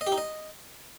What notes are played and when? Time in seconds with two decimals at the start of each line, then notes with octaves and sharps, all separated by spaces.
0.01 D#5
0.07 G4
0.12 D#4
0.18 D#5